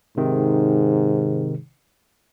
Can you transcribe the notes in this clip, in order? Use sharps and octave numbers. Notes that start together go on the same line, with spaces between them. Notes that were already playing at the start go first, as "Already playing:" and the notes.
G#2 C3 D#3